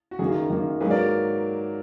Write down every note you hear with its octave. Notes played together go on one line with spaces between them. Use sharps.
F#4
F#2 D#3 A#3 G#4
F#2 D#3 A#3
G#2 F#3 A#3 G#4 B4
A#4 D5